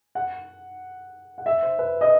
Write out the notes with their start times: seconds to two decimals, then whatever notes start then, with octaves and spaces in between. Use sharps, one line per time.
0.15 F#5
1.38 F#5
1.46 E5
1.63 C5
1.79 B4
2.01 D#5